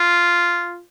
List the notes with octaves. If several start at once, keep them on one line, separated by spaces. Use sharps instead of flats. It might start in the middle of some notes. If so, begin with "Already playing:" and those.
Already playing: F4